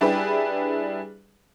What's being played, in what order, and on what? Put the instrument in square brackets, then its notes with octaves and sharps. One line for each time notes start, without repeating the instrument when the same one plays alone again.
[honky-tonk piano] G3 D4 E4 G4 G#4 B4